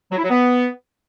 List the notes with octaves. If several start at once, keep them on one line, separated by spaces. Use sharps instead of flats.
F#3
E4
F#3
B3